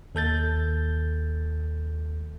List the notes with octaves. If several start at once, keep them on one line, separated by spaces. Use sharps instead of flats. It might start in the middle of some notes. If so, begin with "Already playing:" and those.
D#2 A4 G6 A6